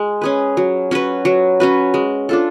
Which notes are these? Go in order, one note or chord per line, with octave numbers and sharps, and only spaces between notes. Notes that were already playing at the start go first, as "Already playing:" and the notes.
Already playing: G#3
C#4 G#4 B4
F#3
C#4 F#4 B4
F#3
C#4 F#4 B4
G#3
D4 F4 A4